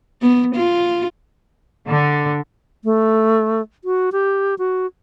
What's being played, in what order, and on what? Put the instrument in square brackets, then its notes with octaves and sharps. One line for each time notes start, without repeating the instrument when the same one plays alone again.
[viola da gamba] B3
F4
[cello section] D3
[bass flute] A3
F#4
G4
F#4